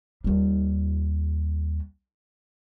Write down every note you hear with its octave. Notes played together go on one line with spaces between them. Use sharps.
D#2 G3